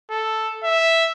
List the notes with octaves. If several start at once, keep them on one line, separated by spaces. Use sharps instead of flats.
A4
E5